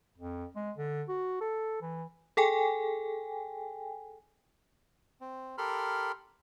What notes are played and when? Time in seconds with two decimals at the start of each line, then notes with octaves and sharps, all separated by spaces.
0.18 F2
0.56 G#3
0.77 D3
1.09 F#4
1.41 A4
1.82 E3
2.37 G#4 A4 G5 G#5
5.21 C4
5.58 G4 A4 A#4 B5 C6 F6